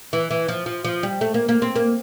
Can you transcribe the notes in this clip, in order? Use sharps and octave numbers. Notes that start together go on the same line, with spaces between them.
E3
E3
F3
F3
F3
G3
A3
A#3
A#3
C4
A#3